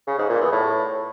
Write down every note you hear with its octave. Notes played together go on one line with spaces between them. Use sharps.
C#3
G#2
A#2
E2
A2